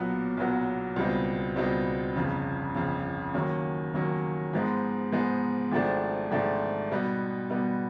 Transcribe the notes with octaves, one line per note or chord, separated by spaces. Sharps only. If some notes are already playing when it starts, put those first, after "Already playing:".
Already playing: B1 A#2 F#3 B3
B1 A#2 F#3 B3
C#2 B2 G3 C4 D#4
C#2 B2 G3 C4 D#4
G1 F2 C#3
G1 F2 C#3
D#2 D#3 F#3 A#3 C#4
D#2 D#3 F#3 A#3 C#4
G#2 F3 G#3 B3 D#4
G#2 F3 G#3 B3 D#4
G#1 G#2 F3 A3 D4
G#1 G#2 F3 A3 D4
B2 G3 B3 D#4
B2 G3 B3 D#4